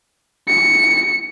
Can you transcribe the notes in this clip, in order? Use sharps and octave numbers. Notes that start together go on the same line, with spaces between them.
C#7